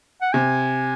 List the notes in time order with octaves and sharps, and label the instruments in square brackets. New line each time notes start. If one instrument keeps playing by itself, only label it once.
[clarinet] F#5
[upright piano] C3 [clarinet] G#5